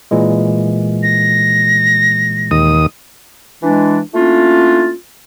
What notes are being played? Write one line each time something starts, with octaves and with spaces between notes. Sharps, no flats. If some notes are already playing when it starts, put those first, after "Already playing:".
A#2 E3 G#3
A#6
D#2 D#6
E3 G#3 D4
A3 A#3 C#4 D4 E4 F4